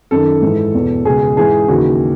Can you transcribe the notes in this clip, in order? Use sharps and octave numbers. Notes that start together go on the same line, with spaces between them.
F#2 D#3 A4
G#2 E3
E2 B2
C#2 B2 G#4
G#2 E3 G#4
D#2 C#3 E3 F#4